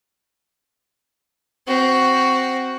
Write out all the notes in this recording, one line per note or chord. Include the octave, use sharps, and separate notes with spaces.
C4 F#4